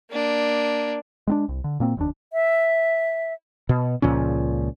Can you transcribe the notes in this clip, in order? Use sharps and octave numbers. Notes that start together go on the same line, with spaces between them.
A#3 D4
G#3 C4 D4
C2
D3
A#2 A#3 C4
F1 D#2 D4
E5
B2
C#2 A#2 F3 C#4